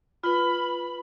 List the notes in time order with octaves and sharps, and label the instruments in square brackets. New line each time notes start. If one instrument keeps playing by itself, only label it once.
[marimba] F4 B4 [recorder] B5